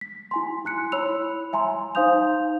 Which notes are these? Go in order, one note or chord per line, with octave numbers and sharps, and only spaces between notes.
B6
E4 G#5 C6
E4 F#6 C#7
E4 C#5 B5 E6 F7
E5 G#5 A#5 C6
D#4 C5 F5 D#6 G6 F7